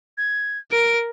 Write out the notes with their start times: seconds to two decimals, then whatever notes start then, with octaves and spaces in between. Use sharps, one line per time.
0.18 G#6
0.72 A#4 D7